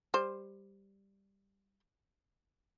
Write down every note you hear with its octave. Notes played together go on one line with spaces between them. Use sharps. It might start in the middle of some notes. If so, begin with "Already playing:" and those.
G3 C5